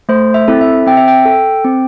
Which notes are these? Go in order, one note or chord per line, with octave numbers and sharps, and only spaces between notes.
A3 C5
E5
C4 E4 A4
E5
C4 G5
E5
G5
A4
C4